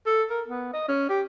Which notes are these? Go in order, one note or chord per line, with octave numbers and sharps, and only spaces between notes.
A4
A#4
B3
D#5
C#4
G4